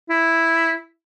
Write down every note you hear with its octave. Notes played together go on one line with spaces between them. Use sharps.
E4